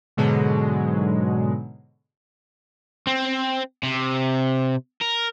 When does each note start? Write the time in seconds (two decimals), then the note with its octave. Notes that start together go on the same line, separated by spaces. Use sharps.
0.17 G#2 B2 D3 F#3 G#3
3.07 C4
3.83 C3
5.02 A#4